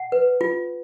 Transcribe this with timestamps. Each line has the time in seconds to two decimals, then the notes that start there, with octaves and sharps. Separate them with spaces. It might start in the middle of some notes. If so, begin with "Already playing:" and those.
Already playing: F#5
0.12 B4
0.41 F4